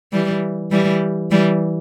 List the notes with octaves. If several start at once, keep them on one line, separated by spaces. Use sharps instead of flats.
E3 G3
E3 G3
E3 G3